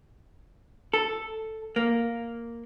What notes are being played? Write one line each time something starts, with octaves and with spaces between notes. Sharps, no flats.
A4
A#3